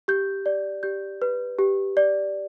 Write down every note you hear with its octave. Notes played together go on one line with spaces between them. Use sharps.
G4 G6
D5
G4 G6
B4
G4
D5